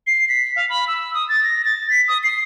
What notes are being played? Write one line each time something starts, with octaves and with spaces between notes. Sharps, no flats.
C7
B6
F5
B5
E6
D#6
A6
A#6
A6
B6
D#6
C7